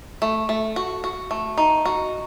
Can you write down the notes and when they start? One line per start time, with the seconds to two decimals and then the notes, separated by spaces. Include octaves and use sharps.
0.22 A3
0.49 A3
0.76 F#4
1.04 F#4
1.31 A3
1.58 D#4
1.85 F#4